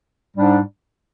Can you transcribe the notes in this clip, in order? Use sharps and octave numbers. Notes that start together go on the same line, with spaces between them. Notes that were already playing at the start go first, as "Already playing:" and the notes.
G#2 G3 D4